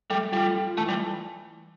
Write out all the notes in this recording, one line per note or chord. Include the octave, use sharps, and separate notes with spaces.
G3 A3
G3 F4
F4
E3 A3
G3